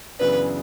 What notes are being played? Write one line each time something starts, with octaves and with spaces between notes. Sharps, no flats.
F#2 C#3 E3 B3 D4 B4